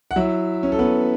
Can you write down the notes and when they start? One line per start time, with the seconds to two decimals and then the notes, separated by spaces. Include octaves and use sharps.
0.11 F#5
0.16 F#3 E4 E5
0.63 C#4
0.72 A4
0.79 B3 B4